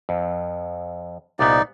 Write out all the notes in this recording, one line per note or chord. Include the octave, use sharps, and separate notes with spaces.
F2
C2 A#2 B3 D#4 D5